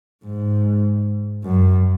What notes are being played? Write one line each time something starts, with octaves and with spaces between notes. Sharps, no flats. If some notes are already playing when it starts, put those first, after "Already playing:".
G#2
F#2